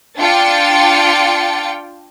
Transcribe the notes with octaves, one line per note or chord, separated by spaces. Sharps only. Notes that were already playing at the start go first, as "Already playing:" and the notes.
D4 F4 G5 A6 C#7